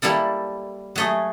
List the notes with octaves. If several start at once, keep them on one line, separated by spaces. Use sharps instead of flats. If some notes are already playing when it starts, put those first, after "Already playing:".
G3 A#3 E4 A4
F#3 A3 G#4